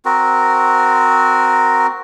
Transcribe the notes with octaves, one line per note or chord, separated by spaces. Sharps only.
C4 F#4 A#4